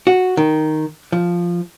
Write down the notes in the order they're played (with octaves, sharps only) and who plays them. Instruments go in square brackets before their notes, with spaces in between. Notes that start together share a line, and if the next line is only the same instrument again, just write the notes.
[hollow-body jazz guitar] F#4
D#3
F3